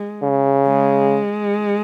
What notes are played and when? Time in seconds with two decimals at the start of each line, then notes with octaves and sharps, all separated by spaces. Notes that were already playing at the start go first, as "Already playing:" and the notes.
Already playing: G#3
0.22 C#3
0.68 G#3